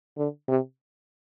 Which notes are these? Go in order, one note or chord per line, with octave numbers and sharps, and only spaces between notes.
D3
C3